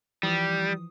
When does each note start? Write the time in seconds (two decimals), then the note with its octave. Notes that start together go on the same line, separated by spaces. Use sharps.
0.23 E3 F3 G3 D#6